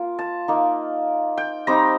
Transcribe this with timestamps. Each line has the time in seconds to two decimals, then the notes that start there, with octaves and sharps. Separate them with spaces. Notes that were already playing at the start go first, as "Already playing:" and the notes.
Already playing: A#3 F4
0.19 A5
0.48 A#3 D#4
1.37 G5
1.67 G3 C4 D#4 A#5